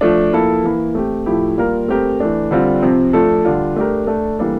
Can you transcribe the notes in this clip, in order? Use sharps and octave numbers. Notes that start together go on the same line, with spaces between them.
F3 A3 D4
F3 A#3 E4 A4
E3 A#3 E4
A3 C4 G4
A2 F3 A3 E4 G4
G3 A#3 F4 A#4
A3 C4 G4 A#4
E3 A3 D4
D3 G3 C4 F4
C3 F3 C4
F3 A3 D4 A4
D3 G3 D4 F4
A3 D4 G4 A#4
A3 D4 A4
E3 G3 A#3 D4 A4